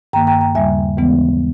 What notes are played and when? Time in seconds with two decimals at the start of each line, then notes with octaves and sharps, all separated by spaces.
0.13 G2 D#3 A#3 G5 A#5
0.27 G5 A#5
0.41 G5 A#5
0.55 D#2 C#3 G3 E5 G#5
0.98 D#2 C#3 E3 G#3 B3